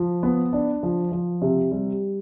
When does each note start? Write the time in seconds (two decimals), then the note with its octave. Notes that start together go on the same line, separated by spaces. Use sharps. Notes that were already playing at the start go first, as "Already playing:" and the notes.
Already playing: F3
0.23 B3
0.53 D4
0.83 F3
1.12 F3
1.42 C3
1.71 G3